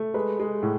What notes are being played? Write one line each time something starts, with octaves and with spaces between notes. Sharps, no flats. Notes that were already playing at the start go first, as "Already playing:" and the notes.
Already playing: A3
G#3 B4
G#3
A2